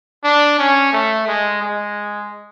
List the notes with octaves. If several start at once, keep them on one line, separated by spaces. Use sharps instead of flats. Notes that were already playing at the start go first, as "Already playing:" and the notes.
D4
C#4
A3
G#3
G#3